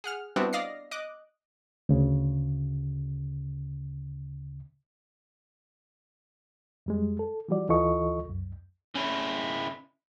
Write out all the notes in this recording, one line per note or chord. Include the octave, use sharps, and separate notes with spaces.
G#4 F#5 F6
G3 B3 C4 D4 E4 F#4
D5 D#5 F5 A#6 C7
D#5 D6 F#6
D2 C#3
F2 G3 G#3
A4
E3 F3 G3 F#4 D5
D2 E3 F4 A4 D#5 C#6
C2 F#2
C#3 E4